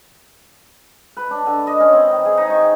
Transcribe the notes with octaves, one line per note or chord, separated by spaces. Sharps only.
B4
D4
D3
D#5
C#4
C4
D#3
G#4
D#4
C#6
G5